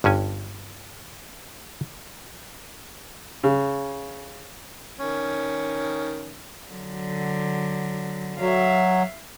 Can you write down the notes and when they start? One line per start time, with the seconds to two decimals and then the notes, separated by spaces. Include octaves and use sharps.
0.04 G1 G2 C#4 G#5
3.43 C#3
4.99 D#3 C#4
6.68 D3 F#3
8.39 F#3 E5 F5